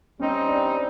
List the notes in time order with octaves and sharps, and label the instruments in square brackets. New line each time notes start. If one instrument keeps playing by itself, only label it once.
[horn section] G3 C4 D#4 [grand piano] C#4
[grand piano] D4